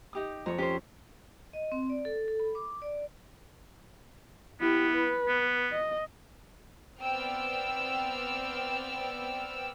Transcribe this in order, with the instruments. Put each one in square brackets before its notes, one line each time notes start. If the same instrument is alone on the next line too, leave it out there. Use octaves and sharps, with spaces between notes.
[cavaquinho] D#4 G4 D#6
[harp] F2 [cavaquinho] C#5 A#5
[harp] C#4 [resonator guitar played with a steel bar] G4 C5
[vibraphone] D#5
C4
D5
A4
A4
B5
D6
D5
[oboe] B3 [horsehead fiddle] E4 G4
[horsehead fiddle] B4
[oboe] B3
[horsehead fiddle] D#5
[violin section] B3 C4 D5 G5 E6 F6